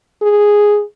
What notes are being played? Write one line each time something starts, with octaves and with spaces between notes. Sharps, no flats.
G#4